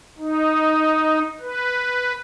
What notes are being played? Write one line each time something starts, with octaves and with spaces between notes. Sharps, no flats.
D#4
B4